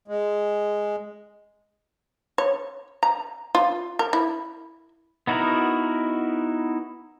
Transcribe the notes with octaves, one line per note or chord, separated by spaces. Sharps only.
G#3
C#5
A#5
F4
A#4
E4
B3 D#4 E4 F#4 A#4